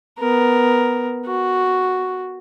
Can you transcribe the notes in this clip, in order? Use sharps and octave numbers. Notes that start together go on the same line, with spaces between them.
B3 A#4
F#4